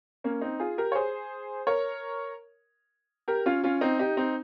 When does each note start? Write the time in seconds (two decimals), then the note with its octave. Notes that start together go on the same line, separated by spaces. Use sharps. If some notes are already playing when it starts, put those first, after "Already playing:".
0.24 A#3 C#4
0.42 C4 D#4
0.60 F4 G#4
0.78 G4 A#4
0.92 C#5
0.95 G#4 C5
1.67 A#4 C#5
3.28 G4 A#4
3.46 C#4 F4
3.64 C#4 F4
3.81 C4 D#4
3.99 D#4 G4
4.17 C4 D#4